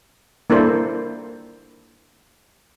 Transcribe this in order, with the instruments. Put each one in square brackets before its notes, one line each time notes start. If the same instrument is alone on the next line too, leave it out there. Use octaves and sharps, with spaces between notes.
[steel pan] A#3 D4 E4 A4 C5